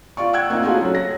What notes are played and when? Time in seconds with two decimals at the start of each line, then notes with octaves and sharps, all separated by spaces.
0.17 F4 D5 C#6
0.33 F#5 G5 E6 F#6 G#6
0.50 A#3 C4 D#4 F4
0.62 A3 D#4 F4 F#4 G#4
0.77 F#3 C#4
0.95 A#6